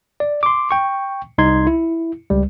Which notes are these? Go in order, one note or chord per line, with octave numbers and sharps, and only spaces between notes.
D5
C6 D6
G5 C#6
C2 D#4 C6 G#6
E4
C#2 G3